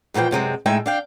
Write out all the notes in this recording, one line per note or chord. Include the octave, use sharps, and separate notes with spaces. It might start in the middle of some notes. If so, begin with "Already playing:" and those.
E2 A#2 E3 F3 G5
F#2 C3 G#3 C4
A2 G#3 D#4 E5 G5 G#5
D4 F5 G5